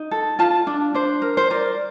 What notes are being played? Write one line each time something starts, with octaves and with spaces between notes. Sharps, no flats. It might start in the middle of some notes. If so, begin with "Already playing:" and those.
Already playing: D#4
A4
F4 A5
D4
D4 C5
A#4
C5
A#4 D5